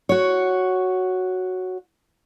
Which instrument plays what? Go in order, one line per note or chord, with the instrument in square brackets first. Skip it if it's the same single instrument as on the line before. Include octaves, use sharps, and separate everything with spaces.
[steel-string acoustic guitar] F#4 C#5